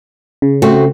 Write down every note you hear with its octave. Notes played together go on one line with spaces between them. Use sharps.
C#3
A3 C4 F#4